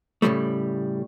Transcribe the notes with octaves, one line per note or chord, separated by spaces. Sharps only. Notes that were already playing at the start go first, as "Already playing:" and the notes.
A2 C#3 F3 G3 A3